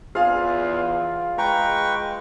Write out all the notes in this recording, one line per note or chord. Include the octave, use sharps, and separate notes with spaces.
E2 F4 G#4 F5
G#3 B4 G5 A#5 C#6